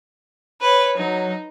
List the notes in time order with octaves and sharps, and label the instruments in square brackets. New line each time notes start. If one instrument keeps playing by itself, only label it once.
[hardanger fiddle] B4 C#5
[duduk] F#3 [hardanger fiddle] D#4